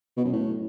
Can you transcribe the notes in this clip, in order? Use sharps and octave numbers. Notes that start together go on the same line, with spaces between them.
B2
F#2
A2